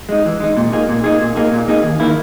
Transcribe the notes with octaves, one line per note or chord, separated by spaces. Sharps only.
G#3 D#4
E3
G#3 D#4
A#2
A#3 D#4 G#4
A#2
A#3 D#4 G#4
A#2
A#3 D#4 G#4
A#2
A#3 D#4 G#4
D#2
D#3 A#3 E4